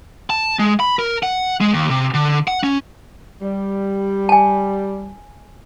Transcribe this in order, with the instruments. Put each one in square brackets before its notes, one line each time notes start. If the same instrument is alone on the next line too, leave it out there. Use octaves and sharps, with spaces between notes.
[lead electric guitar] A5
G#3
B5
A#4
F#5
G#3
D#2
C3
D3
F#5
C#4
[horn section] G3
[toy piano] G#5 A5